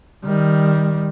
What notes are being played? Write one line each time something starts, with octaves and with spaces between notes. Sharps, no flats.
D#3 G3